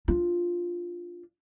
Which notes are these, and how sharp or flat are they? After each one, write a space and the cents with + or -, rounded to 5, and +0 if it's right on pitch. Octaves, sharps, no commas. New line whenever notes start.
D4 +0 F4 +0